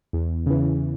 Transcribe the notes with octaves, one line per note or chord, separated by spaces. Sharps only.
E2
C#3 E3